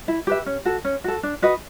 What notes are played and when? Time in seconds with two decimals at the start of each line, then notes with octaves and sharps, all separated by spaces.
0.08 E4
0.27 G4 B4 E5
0.46 C#4
0.65 F#4 A4
0.85 C#4
1.04 F#4 A4
1.23 D4
1.42 F#4 B4 D#5